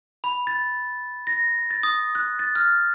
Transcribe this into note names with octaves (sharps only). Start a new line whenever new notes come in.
B5
A6
A#6
A6
D#6
F#6
A6
F6